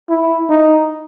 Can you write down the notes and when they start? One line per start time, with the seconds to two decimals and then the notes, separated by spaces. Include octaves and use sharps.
0.10 E4
0.50 D#4